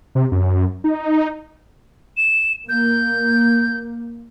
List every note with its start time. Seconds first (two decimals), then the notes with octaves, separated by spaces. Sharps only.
0.15 C3
0.32 F#2
0.84 D#4
2.17 E7
2.69 A#3 G6